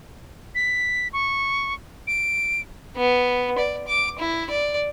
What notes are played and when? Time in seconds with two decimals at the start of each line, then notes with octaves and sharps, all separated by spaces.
0.55 B6
1.13 C#6
2.07 D7
2.96 B3
3.58 D5
3.88 D6
4.19 E4
4.50 D5